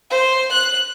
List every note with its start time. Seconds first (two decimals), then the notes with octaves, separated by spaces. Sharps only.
0.11 C5
0.52 F#6